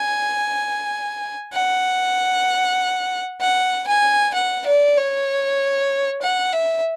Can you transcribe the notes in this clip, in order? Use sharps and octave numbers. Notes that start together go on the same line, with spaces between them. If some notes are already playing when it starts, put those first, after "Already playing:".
Already playing: G#5
F#5
F#5
G#5
F#5
D5
C#5
F#5
E5